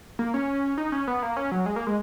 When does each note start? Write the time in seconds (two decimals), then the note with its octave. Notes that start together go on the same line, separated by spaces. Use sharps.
0.19 A#3
0.34 C#4
0.78 D#4
0.92 C#4
1.07 B3
1.22 A#3
1.37 C#4
1.52 F#3
1.66 G#3
1.76 A#3
1.87 G#3